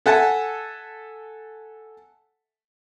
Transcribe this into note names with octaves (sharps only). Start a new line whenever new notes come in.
A4 E5 F#5 G#5 A5